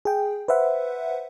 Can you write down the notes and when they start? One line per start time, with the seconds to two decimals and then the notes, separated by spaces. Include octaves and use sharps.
0.05 G#4 G5
0.48 B4 C5 E5 F#5